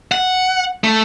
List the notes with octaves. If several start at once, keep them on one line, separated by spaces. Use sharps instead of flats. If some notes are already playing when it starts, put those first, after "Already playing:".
F#5
A3